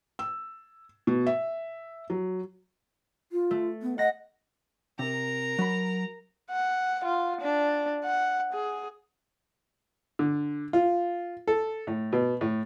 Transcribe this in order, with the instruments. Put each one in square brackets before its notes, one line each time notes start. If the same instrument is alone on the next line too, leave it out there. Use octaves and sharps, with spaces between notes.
[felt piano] E6
B2
E5
F#3
[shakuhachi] F4
[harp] A3
[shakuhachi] B3
[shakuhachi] D#5 [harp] F#5 A#6
[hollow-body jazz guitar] C3 [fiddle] A#4 A#5
[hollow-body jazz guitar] F#3 B5
[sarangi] F#5
F4
D4
F#5
G#4
[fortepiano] D3
F4
A4
A2
B2
A2